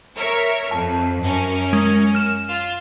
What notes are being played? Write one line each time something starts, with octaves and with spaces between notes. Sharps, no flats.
A#4 C#5 E5
F2 A5
F#2 C#4 A#4
G#3
F6 E7
F4